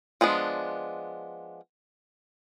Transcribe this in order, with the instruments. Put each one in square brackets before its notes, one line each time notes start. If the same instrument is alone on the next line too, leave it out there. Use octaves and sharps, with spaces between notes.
[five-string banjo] F3 G#3 B3 D4